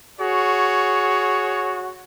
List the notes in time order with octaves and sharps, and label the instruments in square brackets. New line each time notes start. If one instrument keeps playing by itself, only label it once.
[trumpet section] F#4 G#4 C#5